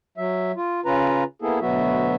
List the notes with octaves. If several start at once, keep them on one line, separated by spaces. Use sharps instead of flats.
F#3 E5
F4
C#3 C#4 F4 B4 A#5
A#3 B3 E4 G#4 A4
D2 B2 F#3 B3 F#4 E5